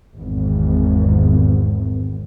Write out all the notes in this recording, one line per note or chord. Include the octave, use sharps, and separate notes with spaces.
G#1 E2